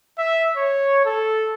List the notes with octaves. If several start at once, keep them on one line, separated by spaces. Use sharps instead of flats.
E5
C#5
A4